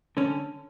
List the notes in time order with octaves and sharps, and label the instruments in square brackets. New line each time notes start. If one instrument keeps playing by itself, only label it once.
[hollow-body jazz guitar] D3 C#4